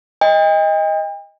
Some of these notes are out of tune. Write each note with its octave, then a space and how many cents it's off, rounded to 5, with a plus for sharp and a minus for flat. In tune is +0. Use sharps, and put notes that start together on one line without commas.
D#5 +15 G5 +40